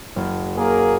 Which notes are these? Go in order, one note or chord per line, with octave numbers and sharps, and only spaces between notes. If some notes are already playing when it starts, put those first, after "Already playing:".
F#1
A#3 G#4 A#4